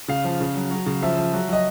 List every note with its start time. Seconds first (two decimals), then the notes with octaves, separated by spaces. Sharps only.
0.08 C#3 F5
0.24 F3
0.40 C#3
0.56 F#3
0.71 F#3
0.86 C#3
1.02 F3 E5
1.17 F3
1.33 F#3
1.49 F#3 D#5